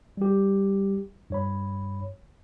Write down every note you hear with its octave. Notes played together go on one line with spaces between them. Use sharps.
G3 G4
G2 C#5 B5